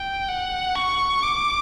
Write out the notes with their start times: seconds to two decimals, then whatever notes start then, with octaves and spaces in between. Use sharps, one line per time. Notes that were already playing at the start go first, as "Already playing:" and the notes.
Already playing: G5
0.28 F#5
0.76 C#6
1.23 D6